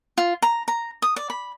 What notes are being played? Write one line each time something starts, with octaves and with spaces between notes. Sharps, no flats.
F4
A#5
A#5
D#6
D5
B5